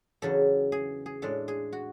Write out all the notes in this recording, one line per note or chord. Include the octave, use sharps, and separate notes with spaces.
E2 C#3 F#3 C#4 A4
G#4
G#4
A2 G#3 D4 A4
G#4
F#4